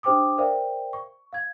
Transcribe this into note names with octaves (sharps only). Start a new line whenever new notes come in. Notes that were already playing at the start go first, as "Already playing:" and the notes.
D4 G4 C5 G5 D6 D#6
A#4 C5 D5 E5 F5 G5
C#6
F5 G#6